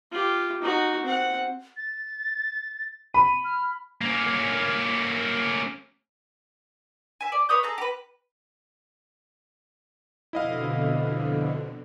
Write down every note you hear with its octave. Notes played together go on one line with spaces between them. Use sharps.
F4 G4
D#4 F#4
C4 F#5
A6
B5 D#7
F6
A#3 C#4
E5 G#5
D5
B4 C#5 D#6 G6
G#4 A4 A#5
G4 B4
F2 B2 D3 E4 D#5 F5